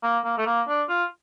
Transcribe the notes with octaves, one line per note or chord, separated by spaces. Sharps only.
A#3
A#3
A3
A#3
D4
F4